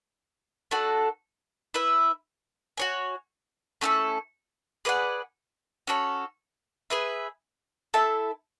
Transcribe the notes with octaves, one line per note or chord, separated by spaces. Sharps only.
A3 D4 F#4 A4
E4 B4 E5
F#4 C#5 G#5
A3 C#4 E4 A4
G#4 B4 D5 F#5
C#4 F#4 A4 C#5
G#4 B4 E5
E4 A4 E5 A5